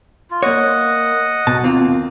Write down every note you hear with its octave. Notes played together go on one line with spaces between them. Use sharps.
F4
A#3 C#5 D#5 F#5
B1 B2 A5
D#2 A#3 C4 F4